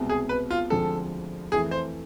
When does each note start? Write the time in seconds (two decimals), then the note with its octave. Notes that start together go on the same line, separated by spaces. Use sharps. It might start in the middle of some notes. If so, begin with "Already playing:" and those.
Already playing: C2 B2 G#3 C4
0.09 G#4
0.29 B4
0.50 F4
0.70 D2 D3 F3 G#3 C4 A4
1.52 F2 E3 A3 G#4
1.71 C5